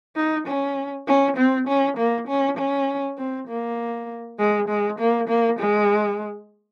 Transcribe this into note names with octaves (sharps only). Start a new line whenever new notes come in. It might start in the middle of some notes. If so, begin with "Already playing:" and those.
D#4
C#4
C#4
C4
C#4
A#3
C#4
C#4
C4
A#3
G#3
G#3
A#3
A#3
G#3